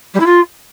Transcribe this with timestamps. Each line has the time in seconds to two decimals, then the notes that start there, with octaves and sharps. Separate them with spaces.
0.14 G3
0.20 E4
0.26 F4